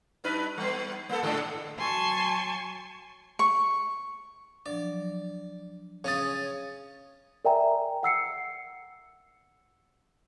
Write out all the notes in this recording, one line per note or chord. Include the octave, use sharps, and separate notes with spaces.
G2 D#4 B4
G3 B3
A#3 B3 A4
G#2 D3 A4
F#3 G#5 A5 C6 C#6
C#6
F3 F#3 D4 D5
C#3 C#4 C#5 D#6 A6
A#4 D5 E5 G5 G#5 A#5
F#5 E6 C7 C#7